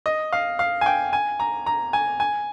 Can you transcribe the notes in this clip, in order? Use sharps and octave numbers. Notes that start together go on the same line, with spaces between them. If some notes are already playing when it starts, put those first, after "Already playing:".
D#5
F5
F5
G#5
G5
G#5
A#5
A#5
G#5
G#5